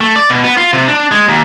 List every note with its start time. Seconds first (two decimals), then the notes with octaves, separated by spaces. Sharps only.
0.01 A3
0.16 D5
0.29 B2
0.44 B3
0.57 F4
0.73 C3
0.88 D4
1.12 G#3
1.29 D#2